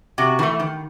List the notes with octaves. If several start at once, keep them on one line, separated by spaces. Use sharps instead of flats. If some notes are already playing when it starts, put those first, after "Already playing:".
C3 F#4
E3 A3
D#3